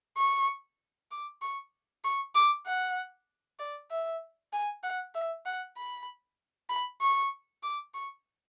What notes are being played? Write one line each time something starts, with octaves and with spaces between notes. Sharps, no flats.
C#6
D6
C#6
C#6
D6
F#5
D5
E5
G#5
F#5
E5
F#5
B5
B5
C#6
D6
C#6